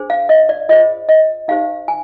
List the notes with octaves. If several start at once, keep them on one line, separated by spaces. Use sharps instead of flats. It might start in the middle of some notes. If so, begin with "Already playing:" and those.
Already playing: D4 G#4 C5
F5
D#5
D5
F4 G#4 C5 D#5
D#5
D#4 G4 C5 F5
G#5